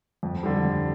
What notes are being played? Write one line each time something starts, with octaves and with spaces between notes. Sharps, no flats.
F2
D3 G3
F2